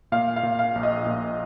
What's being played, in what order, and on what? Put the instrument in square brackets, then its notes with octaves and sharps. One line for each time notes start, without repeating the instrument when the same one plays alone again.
[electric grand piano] A#2 [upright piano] F5
[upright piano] F5
[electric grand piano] A#2
[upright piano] F5
[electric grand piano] A#1
[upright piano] D#5
[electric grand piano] A#2